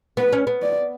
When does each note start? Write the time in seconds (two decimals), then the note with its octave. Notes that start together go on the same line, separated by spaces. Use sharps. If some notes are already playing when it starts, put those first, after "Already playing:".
0.17 B3 B4
0.33 C#4
0.47 B3
0.62 D5